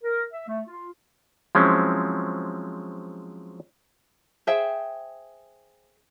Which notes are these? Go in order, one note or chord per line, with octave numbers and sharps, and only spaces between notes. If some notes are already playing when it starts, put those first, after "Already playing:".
A#4
E5
A3
F4
F3 F#3 G#3 C4 C#4 E4
G#4 C5 E5 G5